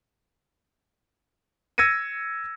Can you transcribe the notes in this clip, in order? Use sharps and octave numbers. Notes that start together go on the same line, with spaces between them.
E6 G#6 A#6 C#7 D#7